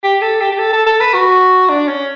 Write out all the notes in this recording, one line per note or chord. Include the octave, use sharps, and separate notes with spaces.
G4
A4
G4
G4
A4
A4
A4
B4
F#4
D4
C#4